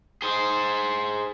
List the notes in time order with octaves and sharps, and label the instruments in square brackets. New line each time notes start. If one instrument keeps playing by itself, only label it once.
[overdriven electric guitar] G#4 C5